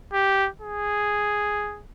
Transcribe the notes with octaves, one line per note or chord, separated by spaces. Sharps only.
G4
G#4